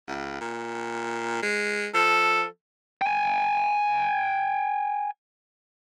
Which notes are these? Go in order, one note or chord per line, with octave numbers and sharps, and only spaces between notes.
C#2
A#2
G#3
F3 A4
G5 G#5